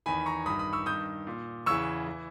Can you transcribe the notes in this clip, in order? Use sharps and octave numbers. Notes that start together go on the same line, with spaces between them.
E2 D#3 G#5 B5
A#5 C#6
G2 D#3 B5 D#6
B5 D#6
C#6 E6
G2 D#3 D#6 G6
A#2
E2 C#3 E3 C#6 E6
E3